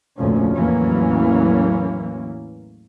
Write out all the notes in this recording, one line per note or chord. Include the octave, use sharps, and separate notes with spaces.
F1 D2 A#2 F3 C#4
A1 E2 E3 F#3 A#3 C#4